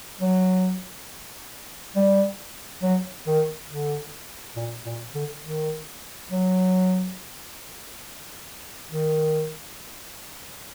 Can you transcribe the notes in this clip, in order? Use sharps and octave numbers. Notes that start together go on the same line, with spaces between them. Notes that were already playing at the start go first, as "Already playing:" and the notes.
F#3
G3
F#3
D#3
D3
A#2
A#2
D3
D#3
F#3
D#3